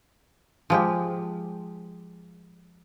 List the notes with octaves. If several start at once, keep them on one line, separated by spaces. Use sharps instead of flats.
F3 G#3 G4